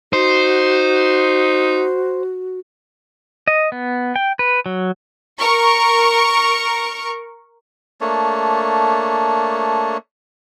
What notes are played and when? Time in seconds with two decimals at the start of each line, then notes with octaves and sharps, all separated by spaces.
0.13 D#4 F#4 C5
3.48 D#5
3.72 B3
4.16 G5
4.39 B4
4.66 F#3
5.40 A#4 C#6
8.01 A3 A#3 D4 C#5